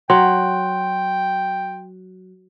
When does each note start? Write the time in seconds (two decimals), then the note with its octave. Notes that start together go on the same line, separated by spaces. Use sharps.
0.10 F#3 G5 C6